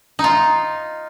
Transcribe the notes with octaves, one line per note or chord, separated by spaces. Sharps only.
D#4
F4